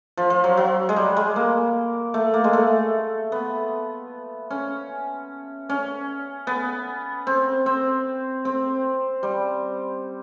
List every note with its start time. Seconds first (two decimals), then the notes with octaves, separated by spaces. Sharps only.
0.17 F3
0.30 F3
0.44 F#3
0.57 F#3
0.89 G#3
0.96 G3
1.17 G#3
1.36 A#3
2.14 A3
2.34 A#3
2.44 G#3
2.53 A3
3.32 B3
4.51 C#4
5.69 C#4
6.47 B3
7.27 C4
7.66 C4
8.45 C4
9.23 G3